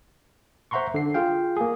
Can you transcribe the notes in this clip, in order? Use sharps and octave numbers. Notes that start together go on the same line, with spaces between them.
C5 E5 F#5 A#5 C6 C#6
D3 C7
F4 G#4 F5 G5
A#3 G#4